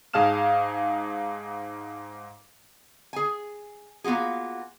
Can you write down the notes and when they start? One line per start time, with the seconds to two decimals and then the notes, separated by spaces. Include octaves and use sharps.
0.13 G#2 G#4 F5 A5 F6 E7
3.13 G#4 G#5
4.04 A#3 B3 F4 F#4 G#4